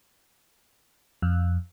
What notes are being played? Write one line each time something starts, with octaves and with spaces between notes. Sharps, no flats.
F2